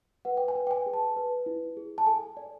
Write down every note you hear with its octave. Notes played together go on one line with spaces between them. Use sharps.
B4 F#5
G5
G#5
B4
G5
G#5
G#4
A5
B4
E4
G#4
A5
A4 G#5
D5